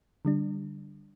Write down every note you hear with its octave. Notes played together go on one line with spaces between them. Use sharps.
D3 G3 D4